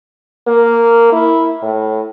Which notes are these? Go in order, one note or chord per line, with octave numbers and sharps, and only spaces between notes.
A#3
E4
A2